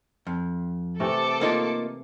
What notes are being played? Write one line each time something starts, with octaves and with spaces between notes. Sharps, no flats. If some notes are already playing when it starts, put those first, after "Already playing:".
F2
C3 E3 A3 A4 D6 C#7
A#3 D#4 F4